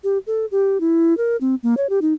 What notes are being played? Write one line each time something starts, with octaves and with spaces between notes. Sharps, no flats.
G4
A4
G4
E4
A#4
C4
A#3
C#5
G4
D#4